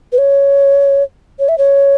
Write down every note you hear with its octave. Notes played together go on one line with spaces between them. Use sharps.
B4
C#5
C#5
E5
C#5